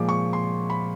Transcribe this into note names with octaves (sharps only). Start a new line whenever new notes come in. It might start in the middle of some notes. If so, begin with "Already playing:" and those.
Already playing: A#2 F3 G#3 D6
C#6
C6
B5